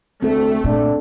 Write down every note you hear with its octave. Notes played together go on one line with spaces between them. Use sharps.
D2 A3 C4 A4
A#2 D4